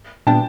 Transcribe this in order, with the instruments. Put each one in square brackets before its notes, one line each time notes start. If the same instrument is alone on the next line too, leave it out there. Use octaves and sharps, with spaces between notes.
[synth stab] A#2 G3 B3 D4 [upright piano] G5 A5